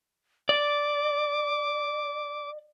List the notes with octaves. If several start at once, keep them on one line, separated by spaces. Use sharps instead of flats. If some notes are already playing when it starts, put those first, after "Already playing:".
D5 D6